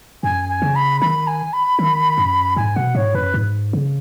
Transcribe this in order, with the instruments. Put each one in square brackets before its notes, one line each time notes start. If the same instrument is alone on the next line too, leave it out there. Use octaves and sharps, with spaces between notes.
[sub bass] F#2 [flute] G#5
[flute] G#5
[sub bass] C#3
[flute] B5
[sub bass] D#3 [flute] B5
[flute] G#5
B5
[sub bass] D#3
F#2
[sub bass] G#2 [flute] G#5
[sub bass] B2 [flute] F#5
[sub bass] G#2 [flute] C#5
[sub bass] F#2 [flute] B4
[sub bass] G#2
C#3